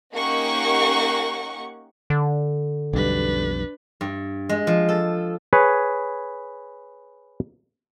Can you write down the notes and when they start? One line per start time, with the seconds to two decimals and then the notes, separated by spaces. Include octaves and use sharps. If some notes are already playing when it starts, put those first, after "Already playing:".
0.14 A#3 C#4 D#4 G4 F#5 C#6
2.10 D3
2.93 B1 F2 G3 D4 B4
4.01 G2
4.49 G#3
4.67 F3
4.89 A4
5.53 G#4 B4 C#5